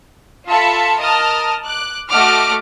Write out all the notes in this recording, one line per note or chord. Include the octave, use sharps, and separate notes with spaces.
F4 A4 E5 A5 B5 C#7
A#4 D#5 A5 D#6 F6
D6 F#6
A3 F#4 D#5 F#5 D6 F6